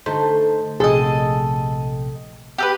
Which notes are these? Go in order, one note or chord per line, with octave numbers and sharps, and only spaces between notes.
D3 A3 D#4 C5
A#1 C3 G#4 A4 D#5 G5
G4 A4 B4